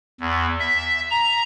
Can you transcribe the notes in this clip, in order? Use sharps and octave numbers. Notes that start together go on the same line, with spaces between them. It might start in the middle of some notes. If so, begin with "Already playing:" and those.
E2
E5
A#5